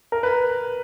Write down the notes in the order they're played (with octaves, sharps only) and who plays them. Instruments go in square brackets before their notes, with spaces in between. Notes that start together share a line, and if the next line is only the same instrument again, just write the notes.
[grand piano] A#4
B4